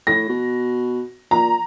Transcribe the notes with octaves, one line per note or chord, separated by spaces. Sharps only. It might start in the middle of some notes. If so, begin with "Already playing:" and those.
A2 A#6
B2
A#2 A#5